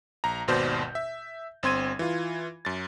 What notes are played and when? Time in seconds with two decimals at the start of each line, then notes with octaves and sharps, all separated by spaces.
0.24 A#1 A#5
0.48 G#1 D#2 B2 C5 D5 G6
0.95 E5
1.63 G1 C4 C6 G#6 D#7
1.99 E3 F4
2.65 F#2 A6